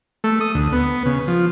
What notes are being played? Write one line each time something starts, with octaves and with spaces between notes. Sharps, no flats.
A3
D#6
D2
B3
C#3
F3